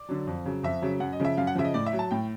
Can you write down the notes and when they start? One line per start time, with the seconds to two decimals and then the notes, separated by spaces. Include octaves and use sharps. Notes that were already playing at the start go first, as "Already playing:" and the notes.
Already playing: D5
0.09 D3 F#3
0.27 F2
0.45 C#3 F#3
0.63 F2 E5
0.82 C#3 F#3
1.00 F#2 F#5
1.13 D#5
1.20 C#3 F3 E5
1.37 F#2 F5
1.47 F#5
1.55 C#3 F3 E5
1.64 D#5
1.74 A2 D5
1.86 E5
1.93 F#3
1.99 A5
2.11 A2 G5